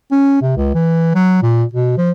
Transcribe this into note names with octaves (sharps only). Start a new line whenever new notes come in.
C#4
C3
C#2
E3
F#3
A#2
B2
F3